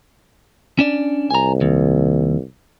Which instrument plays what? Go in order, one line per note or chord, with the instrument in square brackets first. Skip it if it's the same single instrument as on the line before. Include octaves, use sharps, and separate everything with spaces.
[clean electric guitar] C#4 D4 D5
[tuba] C2 [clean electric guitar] G#5 A#5
[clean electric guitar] D#2